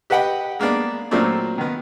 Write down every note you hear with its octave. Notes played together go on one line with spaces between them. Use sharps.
G4 B4 D#5 F#5 G5
G#3 A#3 B3 D4
A#2 F#3 A3 A#3 C4 D4
D#3 B3